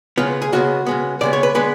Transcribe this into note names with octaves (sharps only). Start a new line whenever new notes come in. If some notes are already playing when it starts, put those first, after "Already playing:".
C#3 G#3 B3 F4
G#4
C#3 G#3 B3 F#4
C#3 G#3 B3
C#3 G#3 B3 D5
C#5
B4
D3 G#3 B3 B4